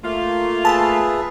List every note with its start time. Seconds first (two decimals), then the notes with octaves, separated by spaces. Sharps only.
0.04 A3 A#3 F4
0.65 G#4 B4 E5 A5